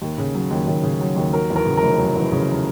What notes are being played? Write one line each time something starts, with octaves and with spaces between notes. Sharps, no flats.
D#2
C#3
F#3
D#2
D#2
C#3
F#3
D#2
F#3 A#4
E2
A#4
C#3
A#4
F1
F#3
E2
C#3